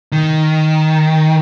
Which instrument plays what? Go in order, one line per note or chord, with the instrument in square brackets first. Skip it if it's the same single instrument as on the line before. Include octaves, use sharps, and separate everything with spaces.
[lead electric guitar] D#3